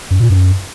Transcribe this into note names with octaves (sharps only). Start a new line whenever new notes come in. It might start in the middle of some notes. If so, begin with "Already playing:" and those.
F#2
A#2
F#2